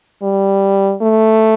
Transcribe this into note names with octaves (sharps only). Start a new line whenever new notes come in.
G3
A3